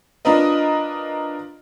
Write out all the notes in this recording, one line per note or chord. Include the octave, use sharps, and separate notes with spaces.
D4 F4 A#4 B4 D#5